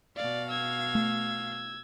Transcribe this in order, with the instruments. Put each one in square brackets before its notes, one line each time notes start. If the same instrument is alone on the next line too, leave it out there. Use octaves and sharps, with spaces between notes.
[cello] B2 F5 [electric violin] D5
[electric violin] E6 G#6
[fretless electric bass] A3